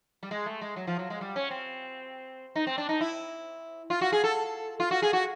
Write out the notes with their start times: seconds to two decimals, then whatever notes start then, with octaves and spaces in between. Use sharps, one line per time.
0.23 G3
0.31 G#3
0.46 A3
0.61 G#3
0.76 F#3
0.87 F3
0.99 F#3
1.10 G#3
1.21 G3
1.36 C#4
1.50 C4
2.55 D#4
2.67 C4
2.78 D4
2.89 D#4
3.01 E4
3.90 F4
4.01 F#4
4.12 G#4
4.24 A4
4.80 F4
4.91 F#4
5.02 G#4
5.13 F#4